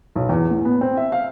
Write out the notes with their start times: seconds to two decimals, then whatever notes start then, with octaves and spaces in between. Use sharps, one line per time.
0.16 B1
0.29 E2
0.51 A2
0.65 B3
0.81 C4
0.97 E5
1.12 F5